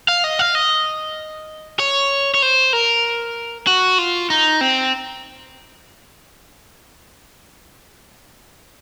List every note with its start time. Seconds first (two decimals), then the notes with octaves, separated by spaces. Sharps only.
0.08 F5
0.24 D#5
0.39 F5
0.55 D#5
1.79 C#5
2.34 C#5
2.43 C5
2.73 A#4
3.67 F#4
3.98 F4
4.30 D#4
4.61 C4